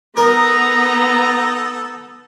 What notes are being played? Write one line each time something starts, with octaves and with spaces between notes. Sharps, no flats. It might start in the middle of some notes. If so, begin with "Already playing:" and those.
B3 D#4 A4 A#4 A#5